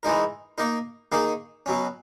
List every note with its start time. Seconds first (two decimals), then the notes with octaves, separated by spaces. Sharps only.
0.03 E3 G#3 D#4 A#4
0.58 A#3 D#4 A#4
1.12 D#3 A#3 D#4 G#4
1.66 B2 F#3 C#4